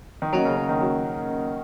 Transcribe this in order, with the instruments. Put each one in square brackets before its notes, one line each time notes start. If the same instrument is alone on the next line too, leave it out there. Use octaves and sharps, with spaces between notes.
[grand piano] D#3
[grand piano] F#3 [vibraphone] A#3 C#4 A#4 D#5 F#5
[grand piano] C#3
C#3
D#3
F#3